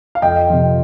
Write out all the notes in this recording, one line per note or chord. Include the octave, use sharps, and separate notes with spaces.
F5
F2 D#5 G5
C3 F3